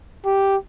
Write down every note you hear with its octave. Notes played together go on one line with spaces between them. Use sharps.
G4